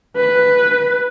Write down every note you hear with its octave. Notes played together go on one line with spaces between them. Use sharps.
B4